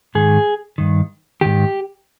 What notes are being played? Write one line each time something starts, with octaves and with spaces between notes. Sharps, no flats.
G#2 D#3 G#4
G2 D#3
G#2 D#3 G4